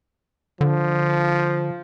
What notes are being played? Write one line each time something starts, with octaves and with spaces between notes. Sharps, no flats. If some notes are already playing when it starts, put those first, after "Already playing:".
D3 F3